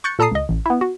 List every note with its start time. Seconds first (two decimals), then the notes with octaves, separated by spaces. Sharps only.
0.04 C#6 F#6 G6 A6 C#7
0.19 A#2 A4 A5 A#5 D#6 C7
0.32 C#2 D#5
0.49 A1
0.66 B3 E4
0.81 F#4